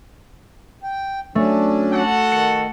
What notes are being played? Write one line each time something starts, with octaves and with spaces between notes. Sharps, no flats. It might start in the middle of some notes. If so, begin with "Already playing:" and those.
G5
F#3 A3 C#4 D4
F#4 A4 F#5
D#3 C#7